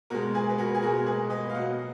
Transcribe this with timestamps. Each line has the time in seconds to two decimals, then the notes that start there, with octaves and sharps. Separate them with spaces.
0.10 B2 G#3 F#4 A#4
0.34 G#4 B4
0.50 B4
0.58 F#4 A#4
0.75 G#4
0.82 B2 G#3 F#4 A#4
1.06 G#4 B4
1.30 B4 D#5
1.50 F5
1.54 B2 F#3 D#5 F#5